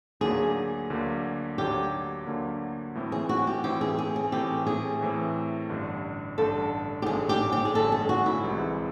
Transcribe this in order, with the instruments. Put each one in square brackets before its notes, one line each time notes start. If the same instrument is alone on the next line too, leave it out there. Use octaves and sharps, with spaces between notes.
[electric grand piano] D2 D3 F#3 A#3 [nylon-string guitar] G#4
[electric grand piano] D2 D3 F#3 A#3
[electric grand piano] D2 D3 F#3 A#3 [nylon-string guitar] G4
[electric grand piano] D2 D3 F#3 A#3
A2 E3 A3 C4
[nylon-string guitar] G#4
F#4
G4
[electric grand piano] A2 E3 A3 C4 [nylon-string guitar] G4
[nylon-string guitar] G#4
G#4
G#4
[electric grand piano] A2 E3 A3 C4 [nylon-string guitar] G4
[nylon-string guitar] G#4
[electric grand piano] A2 E3 A3 C4
A1 G2 D3
[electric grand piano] A1 G2 D3 [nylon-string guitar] A4
[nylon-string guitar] G4
[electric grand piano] A1 G2 D3 [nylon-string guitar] G#4
[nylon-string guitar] G4
G4
G#4
[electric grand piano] A1 G2 D3 [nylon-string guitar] A4
[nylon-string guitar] G#4
F#4
E4
[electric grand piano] C2 C3 E3 G#3